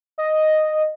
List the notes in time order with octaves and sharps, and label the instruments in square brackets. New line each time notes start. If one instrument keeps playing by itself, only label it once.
[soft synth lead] D#5